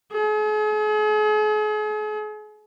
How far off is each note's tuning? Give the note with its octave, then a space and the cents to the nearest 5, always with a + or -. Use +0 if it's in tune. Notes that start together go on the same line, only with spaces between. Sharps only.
G#4 +40